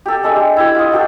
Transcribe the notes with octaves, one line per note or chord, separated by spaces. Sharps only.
G4 A4
G#3 D4 A4 E5
G4
E4 G4
F4 D#5
F#4 G4 A4